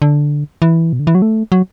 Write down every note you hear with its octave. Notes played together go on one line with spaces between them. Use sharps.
D3
E3
B2
D3
E3
F#3
A3
F#3